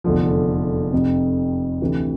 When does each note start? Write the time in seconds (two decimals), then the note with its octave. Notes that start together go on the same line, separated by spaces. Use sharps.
0.04 F1 E2 D3 F3
0.93 F1 F2 C3
1.81 D2 C3 E3